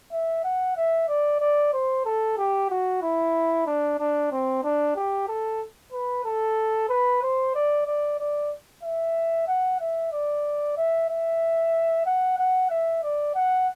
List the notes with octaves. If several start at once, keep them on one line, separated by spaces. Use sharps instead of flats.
E5
F#5
E5
D5
D5
C5
A4
G4
F#4
E4
D4
D4
C4
D4
G4
A4
B4
A4
B4
C5
D5
D5
D5
E5
F#5
E5
D5
E5
E5
F#5
F#5
E5
D5
F#5